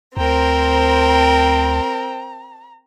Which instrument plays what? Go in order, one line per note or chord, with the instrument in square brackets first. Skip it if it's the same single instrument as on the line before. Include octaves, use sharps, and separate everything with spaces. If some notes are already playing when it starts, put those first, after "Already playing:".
[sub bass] D2 [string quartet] C4 A#4 [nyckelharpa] C5 G5 [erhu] A#5